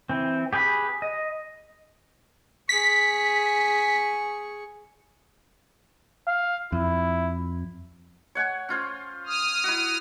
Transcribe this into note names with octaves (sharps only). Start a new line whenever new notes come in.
E3 C4
G4 G#4 B4 C5 B5
D#5
G#4 C#6 B6
F5
F2 E4
C#5 F#5 G#5
C#4 F4 C5
D#6 F6
E4 F#4